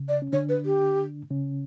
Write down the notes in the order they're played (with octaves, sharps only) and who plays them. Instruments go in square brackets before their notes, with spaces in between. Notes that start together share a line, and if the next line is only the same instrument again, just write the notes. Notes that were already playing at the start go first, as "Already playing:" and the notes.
Already playing: [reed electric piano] C#3
[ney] D5
[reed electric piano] C#4
[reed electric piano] D3 D4 [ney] C#5
[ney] B4
G4
[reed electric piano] C#3 C#4